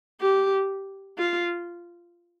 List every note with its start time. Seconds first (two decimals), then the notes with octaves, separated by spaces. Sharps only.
0.21 G4
1.19 F4